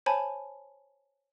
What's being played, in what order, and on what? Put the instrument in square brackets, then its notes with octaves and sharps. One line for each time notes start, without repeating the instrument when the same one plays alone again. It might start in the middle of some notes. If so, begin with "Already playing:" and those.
[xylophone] C5 C#5 G#5 A5 B5